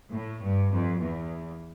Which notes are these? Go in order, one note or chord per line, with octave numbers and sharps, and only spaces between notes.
A2
G2
F2
E2